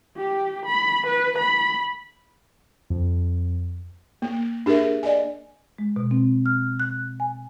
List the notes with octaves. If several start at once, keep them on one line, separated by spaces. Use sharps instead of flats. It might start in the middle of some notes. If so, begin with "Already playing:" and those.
G4
B5
B4
B5
F2
A#3
D4 G4 G#4 A#4 E5
D5 D#5 G#5
G#3
B2
C4
F6
F#6
G#5